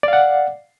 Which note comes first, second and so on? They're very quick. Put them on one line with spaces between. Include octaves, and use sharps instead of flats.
D5 F5 F#5